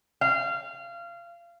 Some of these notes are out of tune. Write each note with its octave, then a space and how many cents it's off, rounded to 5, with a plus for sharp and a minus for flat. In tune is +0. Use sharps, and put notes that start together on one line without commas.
F5 -25